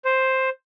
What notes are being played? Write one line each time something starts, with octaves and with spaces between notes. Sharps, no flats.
C5